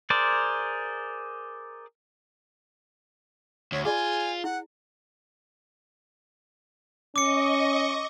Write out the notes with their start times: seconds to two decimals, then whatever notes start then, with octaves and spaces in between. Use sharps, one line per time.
0.10 G#4 A#4 C5 D5
3.72 D2 C#5
3.85 F4 G#4 D5 G#5 B5
4.44 E4 F#5
7.16 C#4 D#5 C#6 D6 C#7